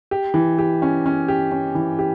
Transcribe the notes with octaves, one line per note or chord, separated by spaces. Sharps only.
G4
E3
G4
C#4
C#4
G4
C#4
E3
G4